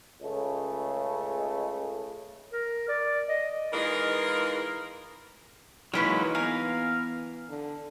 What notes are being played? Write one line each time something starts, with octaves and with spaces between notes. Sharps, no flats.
C#2 C#3 A3
A#4
D5
D#5
E3 G#3 D#4 F4 A#4
E3 F#3 G#3 A#3 C#4 D#4 B4 F6
B3 A#4 F5 G#5
D3